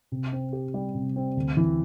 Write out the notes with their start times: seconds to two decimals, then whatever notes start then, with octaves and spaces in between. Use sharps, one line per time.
0.12 C3
0.32 C4
0.53 G4
0.74 G3
0.95 C3
1.16 C4
1.37 D2
1.57 E3